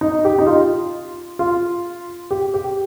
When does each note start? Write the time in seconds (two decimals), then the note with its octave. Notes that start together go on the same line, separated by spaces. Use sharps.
0.01 D#4
0.25 G4
0.39 D#4
0.46 F4
1.39 F4
2.31 G4
2.54 G4